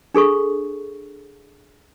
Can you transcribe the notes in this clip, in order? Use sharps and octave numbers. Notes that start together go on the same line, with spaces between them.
D4 G#4 A4 C#6